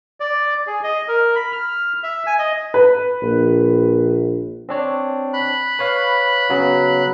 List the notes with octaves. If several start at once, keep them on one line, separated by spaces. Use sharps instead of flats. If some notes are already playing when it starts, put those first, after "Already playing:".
D5
G#4
D#5
A#4
B5
F6
E5
G#5
D#5
B4
A#1
C4 D4 C#5
B5 F#6
B4 C#5 F5
C#3 F#3 B3